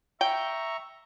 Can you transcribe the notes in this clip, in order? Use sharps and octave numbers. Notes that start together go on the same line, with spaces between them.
E5 G5 A#5 C#6